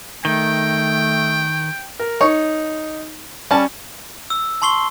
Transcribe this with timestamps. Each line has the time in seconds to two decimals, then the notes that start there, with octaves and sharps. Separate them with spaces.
0.25 D#3 A3 G5
1.99 A#4
2.21 D#4 C#5
3.51 G3 C#4 A5
4.30 E6
4.62 A5 C6 C#6 C7 G7